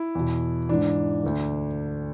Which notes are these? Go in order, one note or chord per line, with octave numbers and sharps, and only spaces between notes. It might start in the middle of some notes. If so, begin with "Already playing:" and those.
Already playing: E4
E2 B2
G#2 E3 D4
D2 D3